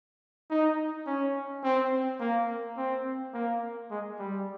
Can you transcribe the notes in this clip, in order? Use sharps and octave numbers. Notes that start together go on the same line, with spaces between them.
D#4
C#4
C4
A#3
C4
A#3
G#3
G3